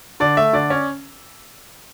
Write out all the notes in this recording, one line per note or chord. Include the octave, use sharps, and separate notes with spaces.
D3 D5
A3 E5
D3 D5
C#4